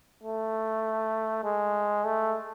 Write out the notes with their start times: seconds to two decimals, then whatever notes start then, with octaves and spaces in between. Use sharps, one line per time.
0.24 A3
1.44 G#3
2.05 A3